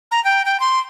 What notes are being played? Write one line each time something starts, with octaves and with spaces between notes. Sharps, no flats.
A#5
G5
G5
C6